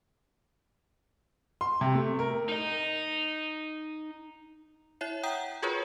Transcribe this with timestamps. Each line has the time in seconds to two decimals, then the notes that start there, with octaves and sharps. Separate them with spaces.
1.61 C6
1.81 C3
1.95 A3
2.19 A#4
2.48 D#4 D#5
5.01 E4 C#5 E5 C7
5.23 F#5 G5 A#5 D#6 G6
5.62 F4 F#4 G#4 A#4 B4 C#5